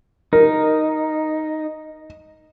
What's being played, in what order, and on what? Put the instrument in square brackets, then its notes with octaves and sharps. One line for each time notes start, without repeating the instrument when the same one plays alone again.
[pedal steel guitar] D#4 [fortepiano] A#4